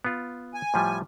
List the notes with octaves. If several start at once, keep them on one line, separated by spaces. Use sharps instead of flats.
B3 F4
G#5
A2 F3 G3